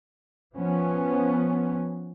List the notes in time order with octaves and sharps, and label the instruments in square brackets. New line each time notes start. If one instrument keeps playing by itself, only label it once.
[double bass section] F3 B3 C#4